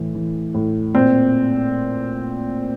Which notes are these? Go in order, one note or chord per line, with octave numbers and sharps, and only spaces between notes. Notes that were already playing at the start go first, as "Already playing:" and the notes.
Already playing: A2 E3
E3
A2
A#2 C4